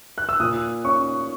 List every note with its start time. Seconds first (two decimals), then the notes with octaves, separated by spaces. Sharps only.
0.18 F#6
0.29 E6
0.40 A#2 D#6
0.84 C#4 C#6